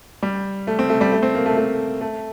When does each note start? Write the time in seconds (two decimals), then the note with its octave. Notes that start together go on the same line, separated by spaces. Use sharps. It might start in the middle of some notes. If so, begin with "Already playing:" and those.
0.23 G3
0.67 A3
0.79 C4
0.90 A3
1.01 G3
1.12 A3
1.23 C4
1.35 A#3
1.46 A3
1.57 A3
2.01 A3